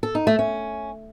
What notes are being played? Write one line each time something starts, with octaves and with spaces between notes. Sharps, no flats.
A4
D#4
A3
C#4